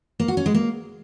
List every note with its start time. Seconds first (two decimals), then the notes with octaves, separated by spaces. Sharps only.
0.20 A#3
0.28 F#4
0.37 C#4
0.46 G#3
0.54 A#3